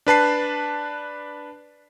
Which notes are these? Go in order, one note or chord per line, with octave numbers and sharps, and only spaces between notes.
D4 B4 A5 C7